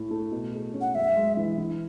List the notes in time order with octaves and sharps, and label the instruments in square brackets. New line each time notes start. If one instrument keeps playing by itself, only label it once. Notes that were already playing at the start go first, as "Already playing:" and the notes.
Already playing: [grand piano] A2 E4
A3
B2
G#4
C#4
[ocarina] F#5
[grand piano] F#2 [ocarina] E5
[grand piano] G#3
E3
E3